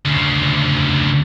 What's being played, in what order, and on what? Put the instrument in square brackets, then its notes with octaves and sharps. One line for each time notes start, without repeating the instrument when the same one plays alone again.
[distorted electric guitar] D2 C#3